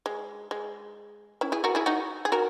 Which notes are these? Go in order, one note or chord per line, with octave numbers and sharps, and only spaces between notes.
G#3
G#3
C#4 E4
E4 G#4
F#4 A#4
E4 G#4
D#4 F#4
G#4
F#4 A#4